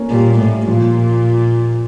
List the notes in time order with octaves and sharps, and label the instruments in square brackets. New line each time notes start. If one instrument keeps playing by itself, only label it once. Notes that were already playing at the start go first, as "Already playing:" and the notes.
Already playing: [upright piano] A#3 C#4 A#4 C#5
[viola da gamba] A#2 [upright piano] G3 G4
[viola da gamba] A2
[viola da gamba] A#2 [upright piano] F3 F4